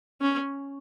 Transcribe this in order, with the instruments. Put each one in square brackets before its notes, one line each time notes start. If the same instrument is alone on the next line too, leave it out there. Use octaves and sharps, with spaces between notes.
[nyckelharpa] C#4